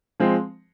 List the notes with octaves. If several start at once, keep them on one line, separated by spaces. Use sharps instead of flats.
F3 G#3 C4